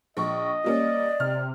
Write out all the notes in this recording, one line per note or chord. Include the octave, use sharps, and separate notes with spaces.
A#1 D#5 C#6
G3 A#3 C#4 D5
C3 F6